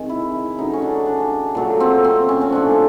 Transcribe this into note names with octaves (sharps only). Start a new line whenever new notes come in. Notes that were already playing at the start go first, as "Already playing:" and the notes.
Already playing: C3 D#3 G#3
E4
E4
C#3 F#3 A3 D#4
C#4
D4
D4
A#2 F#3 A3
C4
C4
C#4
C#4
A2 F3 A3 D4